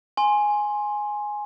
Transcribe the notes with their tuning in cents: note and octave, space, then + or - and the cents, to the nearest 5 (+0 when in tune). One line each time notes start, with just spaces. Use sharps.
G#5 +0 C6 +15